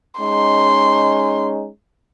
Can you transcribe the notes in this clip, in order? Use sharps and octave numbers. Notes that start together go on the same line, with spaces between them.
G#3 C#4 D#4 C6